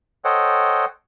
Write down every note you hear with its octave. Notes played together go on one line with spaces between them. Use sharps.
A4 C5 C#5 D#5 F#5 G5